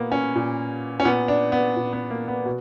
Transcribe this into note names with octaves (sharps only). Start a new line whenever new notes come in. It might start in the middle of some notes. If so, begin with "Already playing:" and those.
Already playing: A#2 A#3 B3
C#4
A#2
C#4
A#2 B3
D4
B3
A#2
B3
A#3
B3
B2